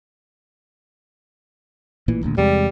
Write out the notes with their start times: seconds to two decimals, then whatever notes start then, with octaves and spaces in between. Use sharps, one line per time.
2.08 A1 A#2 E3
2.23 D#1 D2 A#2
2.38 E2 C3 G3 G#3